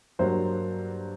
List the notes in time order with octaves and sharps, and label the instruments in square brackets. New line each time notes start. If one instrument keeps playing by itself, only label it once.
[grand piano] G2 F#3 A#3 C5